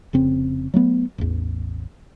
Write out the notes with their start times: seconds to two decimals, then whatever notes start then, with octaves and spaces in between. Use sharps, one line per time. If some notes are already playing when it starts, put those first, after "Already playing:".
0.13 F1 C#3 C4
0.74 F#3 A3 B3
1.18 A1 E2